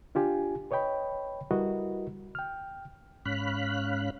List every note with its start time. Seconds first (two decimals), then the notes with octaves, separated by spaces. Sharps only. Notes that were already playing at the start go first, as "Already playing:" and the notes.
0.15 D4 F4 G4 G#5
0.71 B4 C#5 D#5 G5 B5
1.51 G3 E4 F#4 A#4 B4 D#5
2.35 G5 F6
3.26 G#2 C#4 F5 B5 F#6